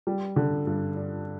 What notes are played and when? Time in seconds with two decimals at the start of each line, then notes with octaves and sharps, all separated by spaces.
0.07 G3
0.36 D3
0.67 G2
0.96 D4